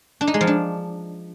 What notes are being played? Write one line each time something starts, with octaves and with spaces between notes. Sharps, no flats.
D4
D#4
G#3
F3
D4